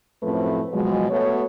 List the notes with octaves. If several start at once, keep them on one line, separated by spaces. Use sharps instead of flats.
F#2 A2 F3 A3 C4 B4
B2 F3 F#3 G#3
A3 B3 F#4 C#5